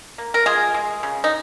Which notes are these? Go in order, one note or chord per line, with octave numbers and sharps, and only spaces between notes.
A#3
A#4
G#3 F4 G#4
G#3
C#3
D#4